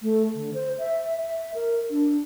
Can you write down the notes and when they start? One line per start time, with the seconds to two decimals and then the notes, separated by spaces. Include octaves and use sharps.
0.01 A3
0.35 D3
0.54 C5
0.79 E5
1.23 E5
1.55 A#4
1.90 D4